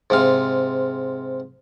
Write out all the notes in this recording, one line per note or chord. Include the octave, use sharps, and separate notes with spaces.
G#2 C3 F5